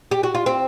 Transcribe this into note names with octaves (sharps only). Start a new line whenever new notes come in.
G4
F#4
F4
C4